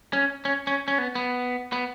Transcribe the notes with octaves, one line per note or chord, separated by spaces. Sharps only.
C#4
C#4
C#4
C#4
B3
B3
B3